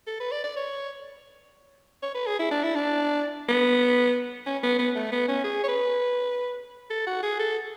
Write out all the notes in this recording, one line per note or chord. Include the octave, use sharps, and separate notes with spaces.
A4
B4
D5
D5
C#5
C#5
B4
G#4
E4
D4
E4
D4
B3
C#4
B3
B3
A3
B3
C#4
G#4
C#5
B4
A4
F#4
G#4
A4